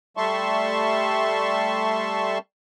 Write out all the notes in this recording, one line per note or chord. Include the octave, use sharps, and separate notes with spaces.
G3 A3 E5 A5 C6 C#6